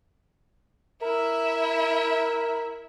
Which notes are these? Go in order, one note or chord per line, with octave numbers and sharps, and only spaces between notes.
E4 A#4 E5